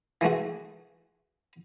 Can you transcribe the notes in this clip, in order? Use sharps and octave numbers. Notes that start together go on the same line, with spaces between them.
E3 G#3 A3 F#4